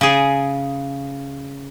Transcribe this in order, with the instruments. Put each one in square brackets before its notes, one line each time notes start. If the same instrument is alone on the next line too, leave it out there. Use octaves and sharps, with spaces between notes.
[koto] C#3 G#4